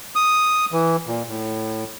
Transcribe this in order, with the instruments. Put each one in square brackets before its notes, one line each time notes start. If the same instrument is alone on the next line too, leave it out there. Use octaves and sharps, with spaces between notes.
[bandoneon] D#6
E3
A#2
A2